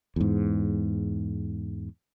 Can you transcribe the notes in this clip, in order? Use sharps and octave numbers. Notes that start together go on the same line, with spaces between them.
E2 G#2